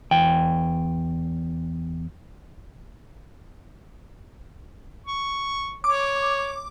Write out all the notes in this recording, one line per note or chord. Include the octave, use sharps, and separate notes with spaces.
E2 G5
C#6
C#5 D6